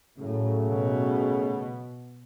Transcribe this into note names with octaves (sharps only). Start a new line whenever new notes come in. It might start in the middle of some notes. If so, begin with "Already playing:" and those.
A2 C#3 F#3 A3
B2